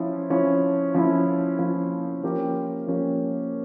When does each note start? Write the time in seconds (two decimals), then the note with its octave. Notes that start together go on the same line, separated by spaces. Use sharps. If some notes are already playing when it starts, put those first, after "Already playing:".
Already playing: F3 C#4 E4
0.30 F3 C#4 E4
0.95 F3 C#4 E4
1.59 F3 C#4 E4
2.23 F3 A#3 C#4 G4 A#4
2.87 F3 A#3 C#4 G4 A#4